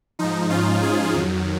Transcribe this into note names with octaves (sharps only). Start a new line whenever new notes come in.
G#2 F3 D#4
C#4 F4
F4 G#4
F2 D#3 F#3